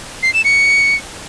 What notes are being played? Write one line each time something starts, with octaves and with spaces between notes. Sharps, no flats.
C7
E7
C#7